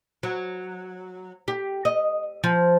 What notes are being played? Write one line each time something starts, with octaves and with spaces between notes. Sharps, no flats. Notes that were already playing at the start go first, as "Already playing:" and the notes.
F#3
G4
D#5
F3